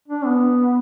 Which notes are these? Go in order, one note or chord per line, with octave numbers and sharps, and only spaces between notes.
D4
B3